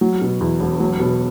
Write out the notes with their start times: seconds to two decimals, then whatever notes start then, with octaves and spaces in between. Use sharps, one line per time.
0.01 F#3
0.22 B2
0.41 E2
0.60 E1
0.80 F#3
1.00 B2